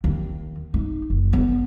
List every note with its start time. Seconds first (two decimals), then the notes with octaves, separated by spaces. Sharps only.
0.04 D#2
0.74 D#4
1.10 F#1
1.33 B3